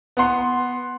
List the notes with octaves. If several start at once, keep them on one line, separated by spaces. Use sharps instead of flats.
B3 F#5 C6